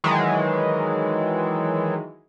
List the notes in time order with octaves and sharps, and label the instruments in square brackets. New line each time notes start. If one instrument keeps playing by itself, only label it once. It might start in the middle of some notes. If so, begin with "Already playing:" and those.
[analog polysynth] D#3 E3 F#3 G#3